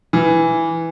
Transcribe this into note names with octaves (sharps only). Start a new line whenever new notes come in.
E3